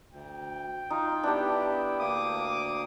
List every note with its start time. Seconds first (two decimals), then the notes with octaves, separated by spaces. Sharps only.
0.12 D2 G5
0.90 D#4 F4
1.23 B3 D4 E4 G4
2.00 D2 A#3 D6 D#6